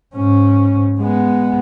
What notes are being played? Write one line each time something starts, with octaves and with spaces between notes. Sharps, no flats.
G#2 C#4
G#3 B3